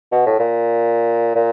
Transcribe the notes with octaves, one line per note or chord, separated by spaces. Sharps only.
B2
A2
A#2
A#2